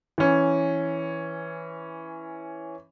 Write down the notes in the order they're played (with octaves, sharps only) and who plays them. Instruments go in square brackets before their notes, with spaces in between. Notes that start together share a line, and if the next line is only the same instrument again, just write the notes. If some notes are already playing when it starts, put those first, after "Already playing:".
[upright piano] E3 C#4